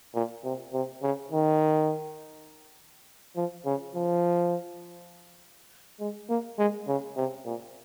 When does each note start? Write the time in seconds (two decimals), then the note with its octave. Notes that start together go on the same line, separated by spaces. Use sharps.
0.14 A#2
0.44 C3
0.73 C3
1.02 C#3
1.32 D#3
3.36 F3
3.66 C#3
3.95 F3
6.00 G#3
6.29 A#3
6.58 G#3
6.88 C#3
7.17 C3
7.46 A#2